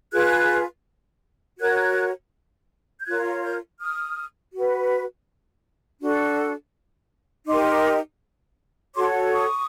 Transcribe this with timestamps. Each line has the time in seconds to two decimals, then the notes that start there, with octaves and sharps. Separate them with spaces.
0.13 F4 G#4 B4 F#6 G#6
1.59 F#4 A#4 C#5 F#6 G#6
3.00 G6
3.06 F4 A#4 C#5 F#6 G#6
3.44 F6 G6
3.80 D#6 F6
4.54 F#4 B4
6.01 D4 F#4 A4
7.48 D#4 G4 A#4 C6 D6
8.95 F#4 A4 C#5 C6 D6
9.32 C#6 D#6